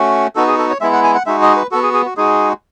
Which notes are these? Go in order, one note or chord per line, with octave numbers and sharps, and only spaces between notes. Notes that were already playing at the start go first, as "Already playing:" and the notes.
Already playing: A3 C#4 F#4
B3 D#4 F#4 A4
G#4
A4
C#5
G#3 B3 E4 E5
F#5
G#5
F#5
G#3 D#4 F#4 E5
D#5
B4
B3 F#4 A4
G#4
G#4
F#4
G#3 D#4 F#4 G#4